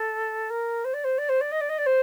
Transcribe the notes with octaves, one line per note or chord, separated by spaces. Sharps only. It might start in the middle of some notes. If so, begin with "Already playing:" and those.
Already playing: A4
A#4
C5
D5
C5
D5
C5
D5
D#5
D5
D#5
D5
C5